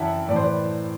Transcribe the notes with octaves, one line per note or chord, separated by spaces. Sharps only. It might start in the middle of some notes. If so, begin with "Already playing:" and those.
Already playing: F#2 E3 E5 F#5 G5 A5
A2 E3 D5
C5
B4 D5